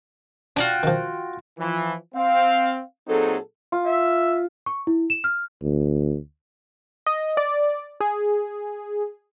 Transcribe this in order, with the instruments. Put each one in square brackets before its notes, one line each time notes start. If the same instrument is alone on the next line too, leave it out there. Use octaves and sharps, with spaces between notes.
[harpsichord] D4 [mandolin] F4 F#4 G5
[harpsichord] D#3 F3
[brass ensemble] E3 F3
C4 F5
A#2 F#3 C4 D#4 G#4 A4
[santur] F4
[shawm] E5
[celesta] C#6
E4
E7
F6
[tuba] D2
[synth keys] D#5
D5
G#4